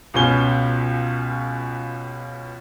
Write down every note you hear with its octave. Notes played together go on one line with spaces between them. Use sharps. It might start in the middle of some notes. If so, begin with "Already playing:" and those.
C#2 B2 C#4 G7